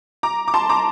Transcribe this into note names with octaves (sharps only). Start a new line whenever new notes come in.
A#5 D6
D6
A5 C6
A#5 D6